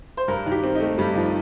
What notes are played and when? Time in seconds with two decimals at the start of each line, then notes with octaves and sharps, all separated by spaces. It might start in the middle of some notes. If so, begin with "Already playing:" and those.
0.17 C5
0.28 G2 A#4
0.46 D#3
0.52 G4
0.63 C4
0.75 D#4
0.80 A3
0.98 G2 G3
1.15 D#3 F3